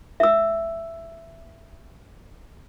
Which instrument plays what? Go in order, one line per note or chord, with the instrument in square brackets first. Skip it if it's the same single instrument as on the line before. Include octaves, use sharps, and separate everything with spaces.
[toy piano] E5 E6